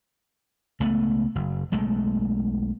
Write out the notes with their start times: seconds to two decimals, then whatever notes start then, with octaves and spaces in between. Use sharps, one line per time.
0.80 C#2 A3 B3
1.35 F#1
1.72 B1 G#3 A3